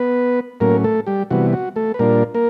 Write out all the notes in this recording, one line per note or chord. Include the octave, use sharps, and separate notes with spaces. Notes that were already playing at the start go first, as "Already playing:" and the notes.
Already playing: B3 B4
A2 F#3 A#3 C#4 A#4
A3 A4
G3 G4
C3 E3 G3 B3 F#4
F#4
A3 A4
B4
A#2 G3 A#3 D4 F4 A#4
A#3 A#4